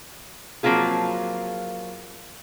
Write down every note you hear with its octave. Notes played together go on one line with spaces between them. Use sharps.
F3 F#3 A#3 C4 F4 G#4